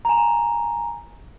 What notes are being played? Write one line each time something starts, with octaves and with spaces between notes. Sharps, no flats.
G#5 A#5